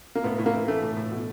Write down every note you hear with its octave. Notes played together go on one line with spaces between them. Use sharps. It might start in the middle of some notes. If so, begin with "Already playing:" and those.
A#3
A2 B3
A2
A#3
E3
E3 A3
A2
A2
B2